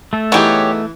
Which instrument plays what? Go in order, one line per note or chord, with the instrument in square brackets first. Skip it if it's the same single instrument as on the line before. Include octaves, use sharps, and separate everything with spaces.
[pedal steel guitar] A3 A4
[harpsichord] E3 [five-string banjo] B3 D#4 G#4 [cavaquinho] G4 C#5